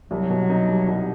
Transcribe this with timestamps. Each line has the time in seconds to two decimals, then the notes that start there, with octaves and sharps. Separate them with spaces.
0.11 C2 F#3
0.30 B2
0.49 D#4
0.68 G3
0.87 C2